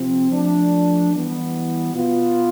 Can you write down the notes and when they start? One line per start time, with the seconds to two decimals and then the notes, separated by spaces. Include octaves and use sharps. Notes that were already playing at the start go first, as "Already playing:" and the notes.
Already playing: C3 F3 C4
0.31 F3 A3 D4
1.12 E3 G3 B3
1.94 B2 B3 F4